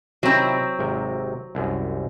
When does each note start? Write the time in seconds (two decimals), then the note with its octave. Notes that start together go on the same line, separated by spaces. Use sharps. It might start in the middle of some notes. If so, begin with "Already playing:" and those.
0.23 C3 D#3 F#3 C4 E4
0.79 G#1 C3 A#4
1.55 C2 F#2